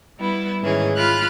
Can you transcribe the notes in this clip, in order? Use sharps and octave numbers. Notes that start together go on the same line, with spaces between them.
G3 B3 E4
G#2 D#3 E3 C#4 G#4
F4 B5 F6 F#6